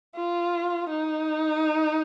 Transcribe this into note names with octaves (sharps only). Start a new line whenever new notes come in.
F4
D#4